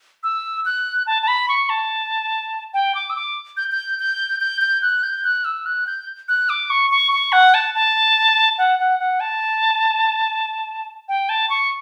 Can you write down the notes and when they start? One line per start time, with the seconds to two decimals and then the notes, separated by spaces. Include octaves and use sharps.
0.23 E6
0.65 F#6
1.07 A5
1.22 A5
1.28 B5
1.49 C#6
1.69 A5
2.74 G5
2.95 D6
3.10 E6
3.16 D6
3.57 G6
3.72 G6
3.99 G6
4.41 G6
4.62 G6
4.82 F#6
5.03 G6
5.24 F#6
5.45 E6
5.66 F#6
5.87 G6
6.28 F#6
6.49 D6
6.70 C#6
6.91 C#6
7.12 C#6
7.32 F#5
7.54 A5
7.75 A5
8.58 F#5
8.79 F#5
9.00 F#5
9.20 A5
11.09 G5
11.29 A5
11.50 C#6